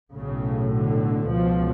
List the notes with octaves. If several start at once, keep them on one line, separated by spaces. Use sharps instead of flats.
B1 A2 C#3
D3
C#2 B2 F3